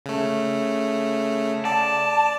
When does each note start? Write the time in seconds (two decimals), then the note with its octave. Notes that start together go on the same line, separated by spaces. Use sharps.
0.06 C#3 A3
1.65 D5 A5